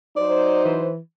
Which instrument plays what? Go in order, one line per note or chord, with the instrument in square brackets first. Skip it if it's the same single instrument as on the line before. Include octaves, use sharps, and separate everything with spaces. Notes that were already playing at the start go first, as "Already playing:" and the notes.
[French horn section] F#3 D#4 C5 [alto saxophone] D5
[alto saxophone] E3